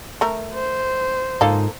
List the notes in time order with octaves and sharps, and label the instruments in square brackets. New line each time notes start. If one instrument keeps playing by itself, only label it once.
[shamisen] A3 A#4
[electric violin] C5
[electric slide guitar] G#2 D#4 F4 [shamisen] A#3 A4 F5